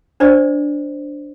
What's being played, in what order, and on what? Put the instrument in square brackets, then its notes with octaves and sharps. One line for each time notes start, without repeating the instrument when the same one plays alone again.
[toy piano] D4 C5 D5 D#5